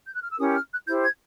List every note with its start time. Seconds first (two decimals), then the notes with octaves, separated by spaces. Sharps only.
0.06 G6
0.14 F#6
0.22 F6
0.30 E6
0.38 C#4 E4 G4 A#4 D#6
0.54 F6
0.71 F#6
0.87 E4 G4 C5 G6
1.03 G#6